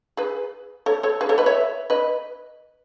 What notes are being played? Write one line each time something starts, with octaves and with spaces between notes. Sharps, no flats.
G#4 B4
A4 C#5
A4 C#5
G#4 B4
A4 C#5
B4 D#5
C#5 E5
B4 D#5